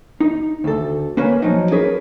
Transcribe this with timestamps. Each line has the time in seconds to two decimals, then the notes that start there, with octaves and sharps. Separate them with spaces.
0.20 D#4
0.64 D2 A4
1.17 A#3 C#4 B4 G#5
1.42 F3 F#3 D#4
1.71 C#4 G#4 A#4 B4